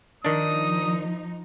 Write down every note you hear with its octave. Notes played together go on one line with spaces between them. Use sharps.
D#3 F3 D4 D#4 D#6